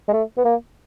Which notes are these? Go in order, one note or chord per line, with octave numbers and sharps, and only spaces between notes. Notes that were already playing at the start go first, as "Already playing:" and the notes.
G#3
A3
B3
A#3